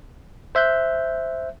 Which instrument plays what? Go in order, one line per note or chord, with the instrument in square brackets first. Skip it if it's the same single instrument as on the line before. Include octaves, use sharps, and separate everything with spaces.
[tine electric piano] C5 E5 F#6 G6